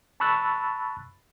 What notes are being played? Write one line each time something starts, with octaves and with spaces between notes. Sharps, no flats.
A5 B5 C#6 E6 F#6 A6